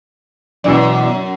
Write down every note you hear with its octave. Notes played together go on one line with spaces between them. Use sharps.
F#2 B2 E3 D5